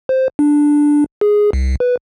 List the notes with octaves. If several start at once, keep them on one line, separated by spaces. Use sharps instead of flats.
C5
D4
G#4
C2
B4